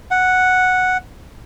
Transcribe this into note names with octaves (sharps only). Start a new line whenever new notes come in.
F#5